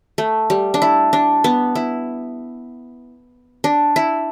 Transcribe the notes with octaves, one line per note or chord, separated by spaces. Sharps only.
A3
G3
D4
E4
D4
B3
E4
D4
E4